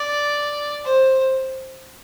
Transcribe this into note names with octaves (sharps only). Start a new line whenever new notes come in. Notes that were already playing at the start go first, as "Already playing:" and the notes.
Already playing: D5
C5